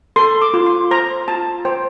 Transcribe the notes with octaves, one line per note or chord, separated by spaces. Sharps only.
A4 C6
D6
F4
C6
C5 A#5
F4 A5
C5 G5